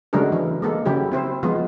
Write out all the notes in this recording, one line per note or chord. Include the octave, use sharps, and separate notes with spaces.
C#3 F#3 G#3 A3 D4 A#4
E3
G#3 A#3 A4
C#3 F#3 E4 G4
C4 E4 C5
F3 G#3 B3 F4